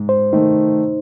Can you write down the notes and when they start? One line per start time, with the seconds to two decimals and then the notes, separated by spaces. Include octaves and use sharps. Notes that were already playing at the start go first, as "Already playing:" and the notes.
Already playing: G#2
0.09 C5
0.33 D#3 A3 D#4